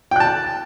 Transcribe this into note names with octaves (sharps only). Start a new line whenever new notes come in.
G5 A5 F#6